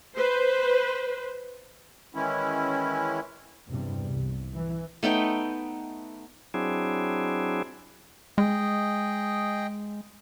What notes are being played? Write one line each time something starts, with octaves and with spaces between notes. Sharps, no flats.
B4 C5
D#3 E3 G#3 C#4 E4
E2 G2 C3 G3
C2
E3
A3 B3 D#4 G5
F#3 C4 D4 E4 G#4
G#3 G#4 D#5 G5